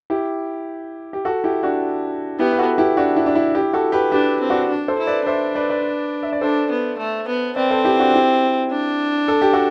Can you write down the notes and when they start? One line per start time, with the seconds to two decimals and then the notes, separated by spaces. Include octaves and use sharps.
0.10 E4 G4
1.13 G4
1.25 F#4 A4
1.44 E4 G4
1.63 D4 F#4
2.39 B3 E4 G4
2.52 B4
2.59 F#4 A4
2.78 E4 G4
2.97 D4 F#4
3.16 E4
3.26 D4
3.35 E4
3.55 E4 G4
3.73 F#4 A4
3.92 G4 B4
4.12 D4 G4 B4
4.41 C4
4.50 D4 F#4
4.70 D4
4.88 A4 C5
4.98 E4
5.07 B4 D5
5.26 D4 C5 E5
5.55 B4 D5
5.70 B4 D5
6.23 E5
6.33 D5
6.41 D4 A4 C5
6.71 B3
6.98 A3
7.28 B3
7.56 C4 B4 D5
7.70 A4 C5
7.84 E4 G4
7.99 D4 F#4
8.14 E4 G4
8.72 D4
9.28 A4
9.42 G4
9.53 F#4 A4